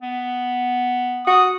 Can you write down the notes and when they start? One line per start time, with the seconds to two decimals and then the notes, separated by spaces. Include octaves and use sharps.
0.02 B3
1.27 F#4 D#6